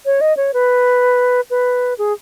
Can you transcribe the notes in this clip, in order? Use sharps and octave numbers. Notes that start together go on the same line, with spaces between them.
C#5
D#5
C#5
B4
B4
G#4